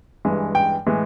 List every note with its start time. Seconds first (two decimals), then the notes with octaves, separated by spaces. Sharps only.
0.25 G2 E3 G#3
0.55 G5
0.87 A2 E3 G#3